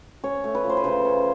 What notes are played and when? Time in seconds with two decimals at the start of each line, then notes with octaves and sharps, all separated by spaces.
0.24 C#4 C#5
0.44 A3
0.55 B4
0.64 F3
0.69 C5
0.77 B4
0.84 C#3 C5
1.05 C#4